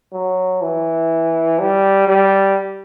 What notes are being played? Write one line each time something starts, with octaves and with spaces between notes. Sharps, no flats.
F#3
E3
G3
G3